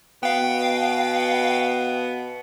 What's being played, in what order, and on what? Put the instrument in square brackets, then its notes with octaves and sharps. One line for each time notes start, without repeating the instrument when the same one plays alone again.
[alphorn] B2 [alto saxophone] B3 [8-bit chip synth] F5 G5